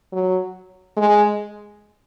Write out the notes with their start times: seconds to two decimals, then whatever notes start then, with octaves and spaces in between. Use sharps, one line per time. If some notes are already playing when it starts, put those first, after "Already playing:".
0.12 F#3
0.97 G#3